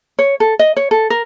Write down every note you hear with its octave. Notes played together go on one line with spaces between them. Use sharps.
C#5
A4
D#5
C#5
A4
A#4